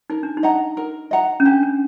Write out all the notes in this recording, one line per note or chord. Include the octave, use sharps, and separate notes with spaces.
D#4 A#4
D4
D#4
D#5 F#5 A#5
A#4
D#5 F#5 A#5
C#4
D4 G4
C#4